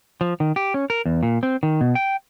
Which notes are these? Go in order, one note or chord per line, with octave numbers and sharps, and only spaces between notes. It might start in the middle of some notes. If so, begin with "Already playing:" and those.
F3
D#3
G4
C#4
A#4
E2
A#2
C4
D#3
B2
G5